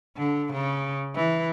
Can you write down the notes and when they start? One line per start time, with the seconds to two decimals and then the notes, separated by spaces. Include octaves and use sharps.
0.17 D3
0.53 C#3
1.15 E3